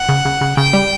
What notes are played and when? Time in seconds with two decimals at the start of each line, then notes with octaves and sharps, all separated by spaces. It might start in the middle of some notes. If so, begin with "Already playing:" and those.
Already playing: F#5
0.09 C#3
0.25 C#3
0.41 C#3
0.57 C#3 G5
0.73 G3